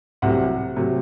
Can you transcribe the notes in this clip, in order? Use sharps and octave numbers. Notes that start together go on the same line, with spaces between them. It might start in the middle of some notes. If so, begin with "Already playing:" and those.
C2 C3 F#3 A3 F#5
C3 F#3 A3